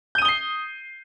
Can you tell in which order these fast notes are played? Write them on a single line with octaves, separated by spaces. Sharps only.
G6 D#7 D#6 G7 C7